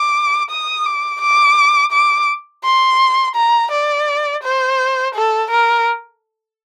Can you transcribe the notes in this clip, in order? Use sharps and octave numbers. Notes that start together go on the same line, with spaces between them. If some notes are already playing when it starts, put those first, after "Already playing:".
Already playing: D6
D#6
D6
D6
D6
C6
A#5
D5
C5
A4
A#4